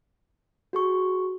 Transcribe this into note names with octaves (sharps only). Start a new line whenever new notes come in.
F#4 G#4 C#6